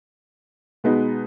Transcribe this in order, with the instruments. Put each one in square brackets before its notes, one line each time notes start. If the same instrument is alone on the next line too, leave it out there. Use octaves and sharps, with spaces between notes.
[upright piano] B2 G#3 B3 D#4